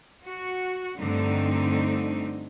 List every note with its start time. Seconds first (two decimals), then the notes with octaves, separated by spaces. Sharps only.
0.25 F#4
0.98 G2 D3 A3 C4 D#4